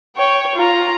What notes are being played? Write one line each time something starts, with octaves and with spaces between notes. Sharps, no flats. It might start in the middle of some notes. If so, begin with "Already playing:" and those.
C#5 G5
F4 A#5